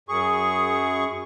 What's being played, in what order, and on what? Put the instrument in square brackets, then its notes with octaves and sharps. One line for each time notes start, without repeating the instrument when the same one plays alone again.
[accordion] F#2 G#4 C#6